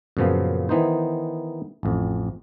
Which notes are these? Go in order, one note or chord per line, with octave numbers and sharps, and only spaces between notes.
F#2 A#2 C#3 F3 B3
D#3 E3 B3 D#4 C5
A1 F2